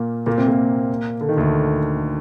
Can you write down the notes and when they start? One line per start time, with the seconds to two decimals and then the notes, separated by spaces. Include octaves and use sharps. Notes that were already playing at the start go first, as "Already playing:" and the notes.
Already playing: A#2 A#3
0.26 A#2 A#3
0.37 C3 C4
0.48 A#2 A#3
1.21 D3
1.29 D#3
1.37 D2 D3